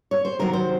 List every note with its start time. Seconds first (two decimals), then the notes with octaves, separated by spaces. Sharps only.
0.11 C#5
0.25 C5
0.39 C3 D#3 F#3 C4 A#4
0.53 C5